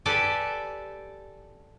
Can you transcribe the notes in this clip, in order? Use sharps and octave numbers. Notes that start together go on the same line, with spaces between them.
G4 A4 B4 D5 G#5 A5